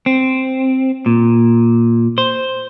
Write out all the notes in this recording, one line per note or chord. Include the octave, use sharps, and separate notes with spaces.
C4
A#2
C5